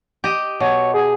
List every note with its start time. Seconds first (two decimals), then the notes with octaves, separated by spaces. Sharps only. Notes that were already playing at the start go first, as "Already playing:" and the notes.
0.24 G4 D#5
0.60 B2 C#5
0.94 G#4